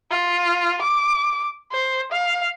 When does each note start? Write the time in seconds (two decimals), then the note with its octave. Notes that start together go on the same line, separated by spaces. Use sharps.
0.11 F4
0.82 D6
1.72 C5
2.12 F5